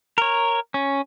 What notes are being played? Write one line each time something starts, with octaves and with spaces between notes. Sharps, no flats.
A#4 C#5
C#4